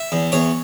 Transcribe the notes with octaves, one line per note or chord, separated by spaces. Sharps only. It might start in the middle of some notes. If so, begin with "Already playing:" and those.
Already playing: E5
E2
E2 C#5